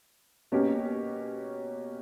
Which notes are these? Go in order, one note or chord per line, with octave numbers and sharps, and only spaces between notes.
B2 A#3 C#4 G4